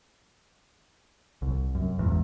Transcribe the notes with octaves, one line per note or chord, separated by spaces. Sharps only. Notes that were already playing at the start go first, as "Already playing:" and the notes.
C2
F#2
A1 E2 G#2